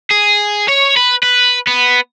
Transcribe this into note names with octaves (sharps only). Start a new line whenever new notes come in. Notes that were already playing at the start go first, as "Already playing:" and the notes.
G#4
C#5
B4
B4
B3